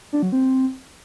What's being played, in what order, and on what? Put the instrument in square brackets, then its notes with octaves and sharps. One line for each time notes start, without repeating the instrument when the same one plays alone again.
[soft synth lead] D4
F#3
C4